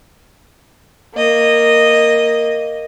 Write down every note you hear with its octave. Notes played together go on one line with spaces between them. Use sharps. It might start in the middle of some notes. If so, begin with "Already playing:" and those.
A#3 D#5